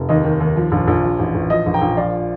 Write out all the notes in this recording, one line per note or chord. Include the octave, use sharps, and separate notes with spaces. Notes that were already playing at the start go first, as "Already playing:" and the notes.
Already playing: F1
D#2 D#5
D#3
D#2
F3
A#1
A#1
F3
A1
A1
F3 D#5
A#1
G5 A#5
A#1
F3 D5 F5